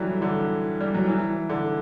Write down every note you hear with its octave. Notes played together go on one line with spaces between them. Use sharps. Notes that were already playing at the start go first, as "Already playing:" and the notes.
Already playing: D3 E3 F#3 G3
D3
G3
F#3
E3
D3